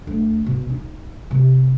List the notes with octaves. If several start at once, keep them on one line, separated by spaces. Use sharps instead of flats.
D2
B2
D#4
C3